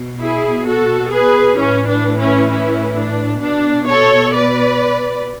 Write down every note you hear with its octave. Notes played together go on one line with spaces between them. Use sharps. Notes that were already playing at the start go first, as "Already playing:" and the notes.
Already playing: B2
E4 G#4
F#4 A4
G#4 B4
A2 E3 C#4
D4
C#4 E4
C#4 E4
D4
B2 D4
A4 C#5
B4 D5